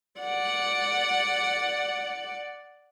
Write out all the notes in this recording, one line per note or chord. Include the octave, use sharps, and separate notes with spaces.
D5 F#5